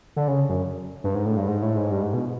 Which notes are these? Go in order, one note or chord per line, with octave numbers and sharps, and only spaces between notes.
D3
C#3
F#2
G2
G#2
A2
G2
G#2
A2
G#2
G2
G#2
B2